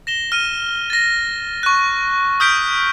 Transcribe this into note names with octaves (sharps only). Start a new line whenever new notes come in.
A#6 E7 G7
F6 D#7
A6 A#6
C#6 F#6
D#6 F6 G6 B6 D7